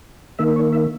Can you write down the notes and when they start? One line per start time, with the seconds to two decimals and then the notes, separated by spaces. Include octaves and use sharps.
0.39 D#3 A#3 E5
0.56 C#5
0.72 E5